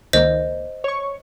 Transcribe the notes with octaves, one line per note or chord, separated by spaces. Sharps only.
C#2 D#3 A#3 C5 D#5
C#5 C#6